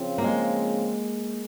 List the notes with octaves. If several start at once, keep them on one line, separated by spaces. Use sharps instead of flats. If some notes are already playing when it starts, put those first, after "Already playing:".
Already playing: C#3 F3 C4
A#3
G#3